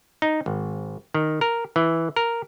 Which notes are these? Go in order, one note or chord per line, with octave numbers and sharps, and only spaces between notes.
D#4
G#1
D#3
A#4
E3
A#4